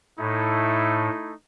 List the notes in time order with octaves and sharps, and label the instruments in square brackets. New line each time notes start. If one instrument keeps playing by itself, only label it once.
[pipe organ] A2 [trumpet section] A3 D#4 E4